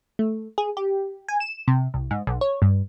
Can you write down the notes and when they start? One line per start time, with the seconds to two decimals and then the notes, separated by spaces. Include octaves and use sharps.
0.19 A3
0.58 G#4
0.77 G4
1.29 G#5
1.40 E7
1.68 C3
1.94 C2
2.11 G#2
2.27 B1
2.41 C#5
2.62 G2